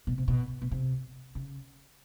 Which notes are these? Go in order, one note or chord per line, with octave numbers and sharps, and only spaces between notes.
B2
C3
B2
B2
C3
C#3